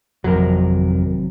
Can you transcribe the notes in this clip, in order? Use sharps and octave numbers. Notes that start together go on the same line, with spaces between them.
G#1 F2 C3 F#3 A#4